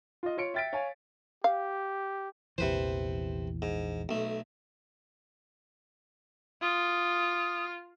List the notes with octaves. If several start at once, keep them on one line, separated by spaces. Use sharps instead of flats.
F4 D#5
F4 C#5 C#7 D7
E5 G5 A6 B6 D7
C#5 F5 G#5
G4 F5
A#1 E2 C3 E3 B4 C5
G#2
B1 A3
F4 D#6